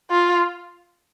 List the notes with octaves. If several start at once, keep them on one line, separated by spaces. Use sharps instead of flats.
F4